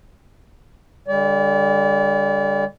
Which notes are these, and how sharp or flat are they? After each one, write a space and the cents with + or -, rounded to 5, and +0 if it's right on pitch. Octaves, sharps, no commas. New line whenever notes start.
D3 +0 G3 +40 D5 -40